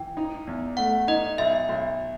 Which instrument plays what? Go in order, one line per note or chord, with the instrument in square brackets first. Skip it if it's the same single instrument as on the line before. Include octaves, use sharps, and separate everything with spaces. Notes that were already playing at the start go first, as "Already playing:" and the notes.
Already playing: [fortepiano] E3 [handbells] G5
[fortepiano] D#4
E2
[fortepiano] A3 [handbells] F#5
[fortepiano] D#4 [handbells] D#5
[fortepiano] B1 [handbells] E5
[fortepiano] B1